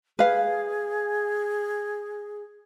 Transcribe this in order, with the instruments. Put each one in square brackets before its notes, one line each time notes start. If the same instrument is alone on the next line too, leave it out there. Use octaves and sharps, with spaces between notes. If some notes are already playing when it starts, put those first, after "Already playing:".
[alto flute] G#4 [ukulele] B4 F5